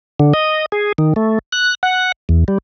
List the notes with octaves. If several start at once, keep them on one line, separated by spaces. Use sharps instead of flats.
D3
D#5
G#4
D#3
A3
F#6
F#5
E2
G3